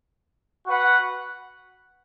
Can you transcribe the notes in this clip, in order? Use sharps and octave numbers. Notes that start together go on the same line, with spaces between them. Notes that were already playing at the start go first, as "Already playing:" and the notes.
F#4 B4 F#5